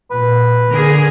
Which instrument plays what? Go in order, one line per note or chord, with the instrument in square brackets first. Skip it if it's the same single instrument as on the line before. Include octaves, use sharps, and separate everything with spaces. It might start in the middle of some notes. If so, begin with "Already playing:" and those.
[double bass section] A#2 [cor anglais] B4
[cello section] D3 G#4 A#4